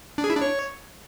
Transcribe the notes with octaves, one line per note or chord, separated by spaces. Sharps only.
D4
G#4
E4
D4
C#5